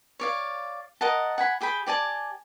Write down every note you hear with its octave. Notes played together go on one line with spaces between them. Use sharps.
C#5 D5 F5
A#4 D#5 F#5 A5
F#5 G#5 B5
G4 G#4 G5 B5
G4 D5 G#5 A5